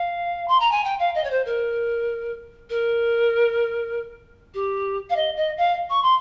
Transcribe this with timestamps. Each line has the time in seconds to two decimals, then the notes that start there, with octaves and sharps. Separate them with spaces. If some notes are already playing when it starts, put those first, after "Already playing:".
Already playing: F5
0.48 C6
0.60 A#5
0.71 G#5
0.84 G5
0.99 F5
1.15 D#5
1.24 C#5
1.30 C5
1.45 A#4
2.70 A#4
4.54 G4
5.09 F5
5.16 D#5
5.36 D#5
5.57 F5
5.90 C#6
6.02 C6